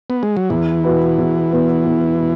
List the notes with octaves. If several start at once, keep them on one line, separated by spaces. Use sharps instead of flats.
B3
G#3
F#3
E2 E3
B2 B3 F#4 B4
E2
B2 B3 F#4 B4
E2
B2